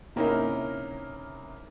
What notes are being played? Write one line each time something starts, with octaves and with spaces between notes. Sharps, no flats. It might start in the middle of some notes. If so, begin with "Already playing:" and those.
C3 A#3 C#4 D#4 E4 A#4